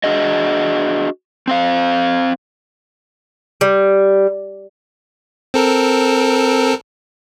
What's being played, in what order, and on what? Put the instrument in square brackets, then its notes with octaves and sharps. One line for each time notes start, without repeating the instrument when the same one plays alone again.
[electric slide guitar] D4 F#4 G#4 D#5
C4 C5 F5
[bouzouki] G3
[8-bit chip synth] C4 A4 A#4